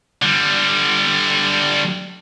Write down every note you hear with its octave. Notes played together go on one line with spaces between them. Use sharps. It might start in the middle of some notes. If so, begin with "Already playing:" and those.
D3 G3